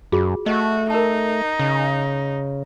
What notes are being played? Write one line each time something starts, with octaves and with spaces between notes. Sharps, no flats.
F#2 F4 F#4 G#4
A3 F#4 D#5
D#4 A#4 A5
C#3